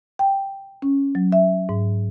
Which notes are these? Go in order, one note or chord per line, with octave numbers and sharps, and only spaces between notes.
G5
C#4
F#3
E5
G#2